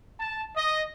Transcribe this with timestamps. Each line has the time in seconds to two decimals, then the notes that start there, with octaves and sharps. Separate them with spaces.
0.20 A5
0.56 D#5